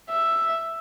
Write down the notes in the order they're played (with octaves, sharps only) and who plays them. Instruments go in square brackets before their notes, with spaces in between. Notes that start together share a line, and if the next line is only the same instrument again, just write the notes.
[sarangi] E5